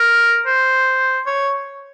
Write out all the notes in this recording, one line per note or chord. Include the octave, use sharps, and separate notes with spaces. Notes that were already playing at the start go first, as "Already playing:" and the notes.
Already playing: A#4
C5
C#5